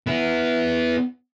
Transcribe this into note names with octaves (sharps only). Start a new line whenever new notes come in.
B3 E4